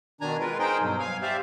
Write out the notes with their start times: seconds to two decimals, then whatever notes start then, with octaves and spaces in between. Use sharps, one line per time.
0.21 B2 D#3 D4 G#5 A#5
0.40 G#3 F4 A#4 B4
0.59 D#4 G#4 A#4 C5 G5
0.81 G2 B2 F#3
0.99 F5 G#5
1.22 G4 C5 D5 E5 F5